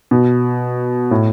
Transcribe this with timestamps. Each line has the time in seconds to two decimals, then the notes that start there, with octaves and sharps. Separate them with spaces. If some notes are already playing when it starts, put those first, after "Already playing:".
0.11 B2
1.11 A2